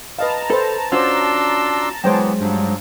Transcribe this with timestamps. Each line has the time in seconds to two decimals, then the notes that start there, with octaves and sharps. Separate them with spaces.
0.19 B4 D#5 F5 A5 A#5
0.50 A4 B4 C5
0.92 C#4 D4 F4 F#4 C5 C#5 C6 E6
2.04 F#2 E3 G#3 B3 C5 C#5 G5
2.40 G2 F3 F#3